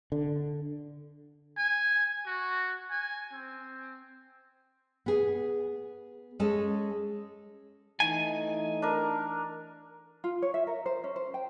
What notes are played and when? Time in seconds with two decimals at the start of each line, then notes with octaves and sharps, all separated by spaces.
0.12 D3
1.58 G#5
2.26 F#4
2.91 G#5
3.33 C4
5.06 B3 G#4
6.40 G#3 C#4 G#4 A4
8.00 E3 A3 D#4 G#5
8.82 D4 A#4
10.24 F4
10.42 C#5
10.54 E5
10.67 A#4
10.86 C5
11.04 C#4
11.16 C5
11.34 G5